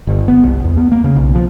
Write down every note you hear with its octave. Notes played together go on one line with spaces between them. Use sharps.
G1
B3
C2
E2
B3
A#3
C#3
B1
F3